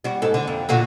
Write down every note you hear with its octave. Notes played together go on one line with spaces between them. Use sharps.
G3 F#4
G#2 A4
D3
F2
A#2 D3 F#4